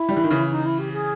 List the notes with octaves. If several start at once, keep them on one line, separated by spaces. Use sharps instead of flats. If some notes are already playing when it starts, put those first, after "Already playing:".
Already playing: E4
G3
E3
D#3
C#3 E3
D#4
E4
G4
G#4